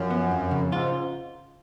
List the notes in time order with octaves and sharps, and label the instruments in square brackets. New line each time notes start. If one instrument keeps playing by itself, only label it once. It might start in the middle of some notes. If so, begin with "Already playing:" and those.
Already playing: [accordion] F#2 [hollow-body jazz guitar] F3
[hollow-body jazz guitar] B3
F2
C#3
[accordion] G#2 [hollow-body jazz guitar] F4